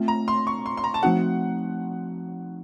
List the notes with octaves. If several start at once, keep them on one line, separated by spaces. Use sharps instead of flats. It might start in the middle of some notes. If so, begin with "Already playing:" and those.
Already playing: A3 C4 F4
A#5
C6
C#6
C6
C6
A#5
A5
F3 A3 C4 D#4 F#4 F#5